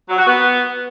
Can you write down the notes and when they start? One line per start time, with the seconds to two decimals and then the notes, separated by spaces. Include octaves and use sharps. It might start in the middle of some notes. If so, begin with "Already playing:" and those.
0.09 F#3
0.18 F#4
0.27 B3